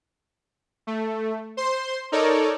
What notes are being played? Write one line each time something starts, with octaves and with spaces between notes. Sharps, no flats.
A3
C5 C6
D#4 A4 A#4 C#5 D5